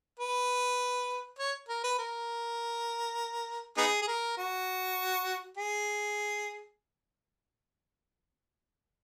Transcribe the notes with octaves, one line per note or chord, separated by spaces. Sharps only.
B4
C#5
A#4
B4
A#4
B3 D#4 G#4
G#4
A#4
F#4
G#4